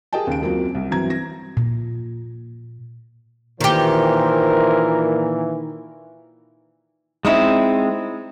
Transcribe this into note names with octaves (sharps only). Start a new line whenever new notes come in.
G4 G#4 A#4 D#5 G5 A5
D#2 C#3 D7
C#2 F#2 A#3 C4 F4 F#4
C2
G1 E3 F#3 C4 A#5 G#6
A#6
A#2
A#2 D#3 E3 G4 A#4 C5
G#3 C4 C#4 D#4 E4